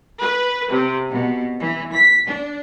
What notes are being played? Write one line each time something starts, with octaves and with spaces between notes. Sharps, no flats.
B4
C3
B2
E3
B6
D4